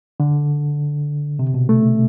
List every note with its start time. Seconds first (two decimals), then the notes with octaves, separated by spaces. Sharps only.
0.20 D3
1.39 C3
1.54 B2
1.69 A3